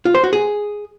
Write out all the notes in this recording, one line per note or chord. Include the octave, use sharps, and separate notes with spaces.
F4
C5
F#4
G#4